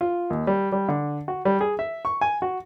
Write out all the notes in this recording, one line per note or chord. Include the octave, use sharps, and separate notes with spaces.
F4
D#2
G3
G3
D3
F#4
G3
G#4
E5
C#6
G#5
F#4